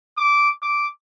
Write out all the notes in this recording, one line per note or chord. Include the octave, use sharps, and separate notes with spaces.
D6
D6